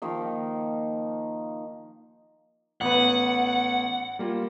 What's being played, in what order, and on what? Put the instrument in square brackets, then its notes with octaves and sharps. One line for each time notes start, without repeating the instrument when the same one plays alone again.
[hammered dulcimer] D#3 F3 A#3 D#4
[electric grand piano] A1 B3 B4 [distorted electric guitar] F#5
[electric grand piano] G3 A#3 F4